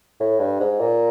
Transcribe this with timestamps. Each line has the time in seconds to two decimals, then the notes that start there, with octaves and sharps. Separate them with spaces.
0.20 A2
0.40 G2
0.60 G#2
0.80 A#2